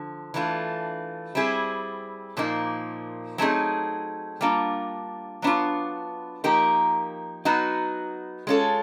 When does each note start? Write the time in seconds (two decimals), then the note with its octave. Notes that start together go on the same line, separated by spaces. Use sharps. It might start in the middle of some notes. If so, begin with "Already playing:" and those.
Already playing: D3 F3
0.34 E3 A3 D4 F4
1.35 G3 C4 E4 G#4
2.37 A#2 F3 A#3 D#4
3.38 F#3 A3 C4 D#4 G#4
4.41 G3 A#3 D4 F4
5.42 F#3 B3 D4 F4
6.44 F3 A#3 D#4 G4 A#4
7.45 F#3 B3 D#4 F#4
8.47 G#3 C#4 F4 A4